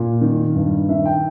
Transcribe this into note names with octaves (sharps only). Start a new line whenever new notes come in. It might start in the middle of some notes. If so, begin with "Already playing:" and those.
Already playing: A#2
D#3
G2
D#3 E5
G5